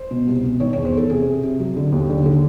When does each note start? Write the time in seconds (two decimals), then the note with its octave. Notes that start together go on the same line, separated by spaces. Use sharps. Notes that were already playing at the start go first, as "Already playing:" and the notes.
Already playing: C5
0.11 B2
0.27 C2
0.43 B2
0.60 D#3 C#5
0.73 C#5
0.77 E2
0.85 C5
0.94 E2 A4
1.10 C3 G#4
1.26 C3
1.43 C3
1.59 F#3
1.77 D3
1.92 D#2
2.10 D3
2.26 D3